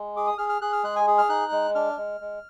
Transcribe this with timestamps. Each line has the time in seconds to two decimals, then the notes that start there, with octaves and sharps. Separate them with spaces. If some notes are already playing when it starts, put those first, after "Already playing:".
Already playing: G#3
0.16 G#4 D6
0.27 D#6
0.38 G#4 F6
0.49 F6
0.61 G#4 F#6
0.73 F6
0.84 G#3 F#6
0.96 G#5
1.07 G#4
1.18 F6
1.29 D#4 F#6
1.52 G#3
1.75 D4 F6
1.97 G#3
2.21 G#3